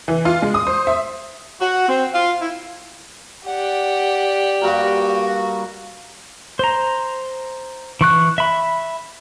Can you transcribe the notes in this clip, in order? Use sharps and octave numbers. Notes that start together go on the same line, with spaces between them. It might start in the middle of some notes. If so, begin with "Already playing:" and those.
E3
F4
G#3
D#6
C5
E5
F#4
C4
F4
E4
G4 D5 F#5
G2 A#3 F#4 A#4
C5 A#5
E3 C#6 F#6
E5 B5